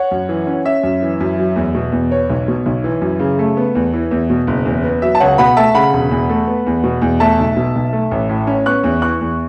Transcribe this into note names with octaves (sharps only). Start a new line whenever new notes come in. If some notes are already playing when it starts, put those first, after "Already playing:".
Already playing: C#5 F#5
F#2
E3
C#4
C#4 E5
F#2
E3
F#2
F#3
E2
B2
E2
B3 C#5
B1
B2
B1
E3
F#2
C#3
A3
B3
E2
E3
E2
B2
F#1
E2
B3
F#3 E5
A5
C#2 C#5 F#5
B2 F#5 B5
A3 E5 A5
C#3 F#5 B5
E1
E2
A3
B3
E2
B2
E2
A3 E5 A5
B1
B2
B1
A3
A1
A2
C#4
B3 C#6 F#6
E2
E3 C#6 F#6
E2